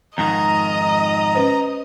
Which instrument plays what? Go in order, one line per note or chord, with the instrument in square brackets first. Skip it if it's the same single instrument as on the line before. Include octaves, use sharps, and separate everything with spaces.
[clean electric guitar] F2 G#2 D#3 [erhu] D#5 [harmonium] A#5
[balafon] C#4 B4 C5